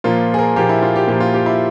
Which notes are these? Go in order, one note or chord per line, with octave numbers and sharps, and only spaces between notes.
A#2 F3 A#3 F4
G#4
A#4
A#2 F3 A#3 G4
E4
F4
G4
A#2 F3 A#3 G4
F4
G4
E4